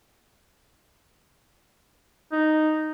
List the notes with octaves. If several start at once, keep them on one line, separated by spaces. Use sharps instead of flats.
D#4